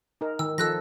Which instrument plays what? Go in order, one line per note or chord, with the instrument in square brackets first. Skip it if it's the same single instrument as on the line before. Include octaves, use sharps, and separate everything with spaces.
[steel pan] D#4 A#4
[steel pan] D#3 [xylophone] E6
[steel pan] F3 A4 [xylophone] E6 F#6 A#6